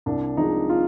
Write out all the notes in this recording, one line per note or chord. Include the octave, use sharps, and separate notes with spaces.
C2 D4
C3 F3 G#3 D#4
F4